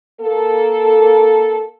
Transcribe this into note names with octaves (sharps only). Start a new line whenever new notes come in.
A#3 A4